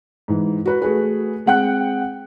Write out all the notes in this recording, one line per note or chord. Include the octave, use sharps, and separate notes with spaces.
G#2 E3
F#4 B4
A3 F#4 G#4 B4
G#3 C4 F#5 G5 F#6